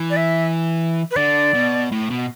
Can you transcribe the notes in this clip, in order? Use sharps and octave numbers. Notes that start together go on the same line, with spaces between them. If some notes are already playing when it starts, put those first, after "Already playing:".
Already playing: E3
D5
E5
B4
D3 D5
B2
A2
B2